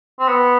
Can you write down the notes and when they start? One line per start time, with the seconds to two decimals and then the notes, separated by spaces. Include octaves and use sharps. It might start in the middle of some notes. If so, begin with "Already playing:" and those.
0.20 C4
0.28 B3